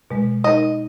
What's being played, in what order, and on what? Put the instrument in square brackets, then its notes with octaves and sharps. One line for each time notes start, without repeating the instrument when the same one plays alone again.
[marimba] B2 G#3
[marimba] D#4 A#4 [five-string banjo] D#5